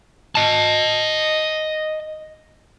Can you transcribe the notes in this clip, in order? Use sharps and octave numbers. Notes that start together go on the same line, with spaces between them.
D#5 A5